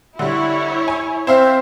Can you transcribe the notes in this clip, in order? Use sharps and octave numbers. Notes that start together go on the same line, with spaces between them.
D3 G3 E4 C#5
G#5
C4 C5 E5 F5